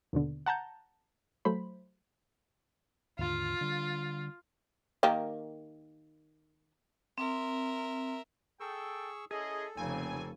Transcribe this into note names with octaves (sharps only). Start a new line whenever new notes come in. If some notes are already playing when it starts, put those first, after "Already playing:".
D#2 B2 D3
F#5 A5 A#5 G6
F#3 A3 C5 B5
D#2 G#2 D3 F4
D3 G3
D#3 A#3 G4
C4 A#4 E5
G#4 A4 G5 C#6 E6
C#4 E4 G#4 A4 D#5
F1 C#3 A#3 C4 G#5